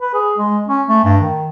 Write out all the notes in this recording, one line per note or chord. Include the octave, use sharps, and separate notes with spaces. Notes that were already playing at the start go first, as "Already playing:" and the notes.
B4
G#4
G#3
C#4
A3
G2
D#3